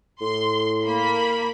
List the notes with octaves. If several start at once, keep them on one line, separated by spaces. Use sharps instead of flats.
A2 C6
A#3 B5